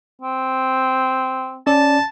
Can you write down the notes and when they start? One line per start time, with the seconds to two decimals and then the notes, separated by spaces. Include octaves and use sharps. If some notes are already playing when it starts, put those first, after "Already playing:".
0.22 C4
1.67 C#4 D5 A5